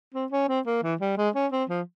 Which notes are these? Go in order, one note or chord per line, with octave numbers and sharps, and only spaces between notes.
C4
C#4
C4
A#3
E3
G3
G#3
C#4
C4
F3